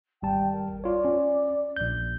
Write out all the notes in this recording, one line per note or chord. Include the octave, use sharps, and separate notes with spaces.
G#1 G3 G5 A5
A#4
F4 C#5 D5
C#4
A#1 G6